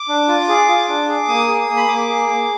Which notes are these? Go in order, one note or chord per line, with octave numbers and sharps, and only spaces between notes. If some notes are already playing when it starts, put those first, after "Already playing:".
Already playing: D6
D4
F4
G#4
F4
D4
G#4
A#3 D#6
G#4
A#3
B5
A#3 D6
G#4
A#3